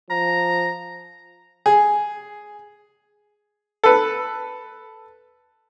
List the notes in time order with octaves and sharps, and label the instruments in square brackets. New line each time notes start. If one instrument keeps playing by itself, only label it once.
[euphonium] F3 [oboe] A#5
[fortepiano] G#4
A4 B4